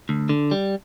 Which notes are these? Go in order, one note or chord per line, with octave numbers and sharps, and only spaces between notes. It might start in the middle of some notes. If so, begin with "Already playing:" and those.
D2
D3
G3